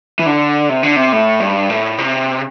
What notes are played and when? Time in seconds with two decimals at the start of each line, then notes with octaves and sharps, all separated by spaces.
0.19 E3
0.26 D3
0.69 C3
0.83 D3
0.96 C3
1.13 A2
1.40 G2
1.70 A2
1.98 C3